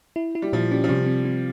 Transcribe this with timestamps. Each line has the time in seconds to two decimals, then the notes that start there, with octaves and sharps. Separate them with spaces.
0.16 E4
0.35 E4
0.42 G3
0.53 A#2 F3
0.71 G3 C#4
0.84 F3
0.89 C3 G3
1.07 C4
1.25 C4